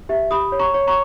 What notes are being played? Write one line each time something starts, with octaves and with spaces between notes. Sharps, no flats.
G4 E5
G4 B5 D#6
C#5
A#5 C#6
C#5
A#5 C#6